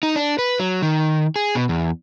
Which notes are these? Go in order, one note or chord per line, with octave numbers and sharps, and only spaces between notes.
D#4
D4
B4
F#3
D#3
G#4
B2
E2